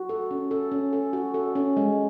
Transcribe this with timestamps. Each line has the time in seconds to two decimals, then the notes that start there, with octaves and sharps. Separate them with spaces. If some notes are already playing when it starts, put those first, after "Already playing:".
Already playing: F#4
0.09 A4
0.31 C#4
0.51 A4
0.72 C#4
0.93 A4
1.13 F#4
1.34 A4
1.55 C#4
1.77 G#3